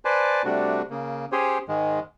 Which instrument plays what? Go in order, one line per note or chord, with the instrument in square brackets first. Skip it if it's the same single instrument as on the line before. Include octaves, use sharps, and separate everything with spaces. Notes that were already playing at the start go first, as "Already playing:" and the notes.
[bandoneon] B4 C5 D5 G#5 A5
C3 G3 A3 D4 F#4
C#3 A#3
C#4 G4 G#4 C5 C#5
G#2 D#3 G#3